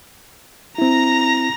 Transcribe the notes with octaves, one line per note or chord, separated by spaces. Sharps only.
C4 E4 A#5 A#6